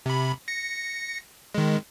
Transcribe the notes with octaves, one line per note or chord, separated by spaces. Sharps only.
C3 B5
A#6 C#7
D#3 G#3